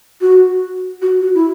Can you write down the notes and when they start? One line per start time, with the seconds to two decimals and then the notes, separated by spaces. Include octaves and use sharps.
0.21 F#4
1.02 F#4
1.21 F#4
1.35 E4